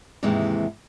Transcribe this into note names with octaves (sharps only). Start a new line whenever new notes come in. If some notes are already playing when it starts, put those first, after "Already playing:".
D#2 G#2 C3 E3 G#3